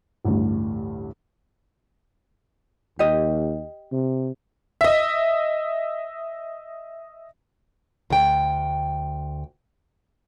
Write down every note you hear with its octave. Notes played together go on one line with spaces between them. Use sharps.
A1 D2 G2
D#2 G4 D#5
C3
D#5 E5
D2 G5